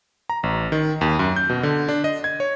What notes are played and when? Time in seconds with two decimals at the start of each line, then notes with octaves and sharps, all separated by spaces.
0.30 A#5
0.43 A1
0.72 D#3
1.01 D#2
1.19 F#2
1.36 G6
1.50 B2
1.63 D3
1.89 D4
2.04 D#5
2.24 G#6
2.40 C#5